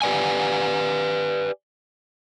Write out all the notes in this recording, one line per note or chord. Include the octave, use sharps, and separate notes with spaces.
G4 B4 D5 G#5